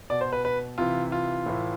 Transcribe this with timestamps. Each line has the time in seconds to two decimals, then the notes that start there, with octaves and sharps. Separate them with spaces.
0.10 B2 D5
0.21 C5
0.33 B4
0.45 B4
0.78 C3 E3 F4
1.12 F4
1.46 A2 E3